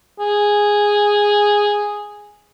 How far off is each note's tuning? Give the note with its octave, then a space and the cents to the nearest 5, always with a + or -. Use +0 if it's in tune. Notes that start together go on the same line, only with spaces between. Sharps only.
G#4 -5